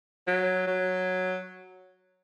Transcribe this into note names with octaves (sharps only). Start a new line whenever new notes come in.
F#3
F#3